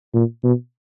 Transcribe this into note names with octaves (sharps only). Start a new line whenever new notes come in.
A#2
B2